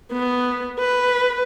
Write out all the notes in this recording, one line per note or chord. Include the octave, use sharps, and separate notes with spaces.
B3
B4